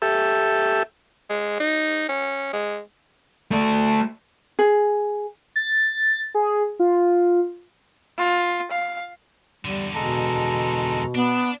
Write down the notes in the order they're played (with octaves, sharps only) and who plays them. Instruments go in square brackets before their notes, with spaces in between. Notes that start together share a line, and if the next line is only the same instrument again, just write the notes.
[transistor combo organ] G4 A4 E5
[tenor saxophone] G#3
D#4
C#4
G#3
[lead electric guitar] A3 D5
[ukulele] G#4
[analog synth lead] A6
G#4
F4
[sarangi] F4
F5
[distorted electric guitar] E2 D3 [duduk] G3
[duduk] B2 [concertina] G#3 A4 A#5
[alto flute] B3 [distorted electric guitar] D4